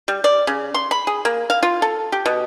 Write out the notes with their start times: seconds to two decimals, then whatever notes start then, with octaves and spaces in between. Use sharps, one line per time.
0.08 G3
0.24 D5
0.47 C#3
0.74 C6
0.91 B5
1.07 G#4
1.25 A#3
1.50 F5
1.63 F4
1.82 A4
2.12 G4
2.26 B2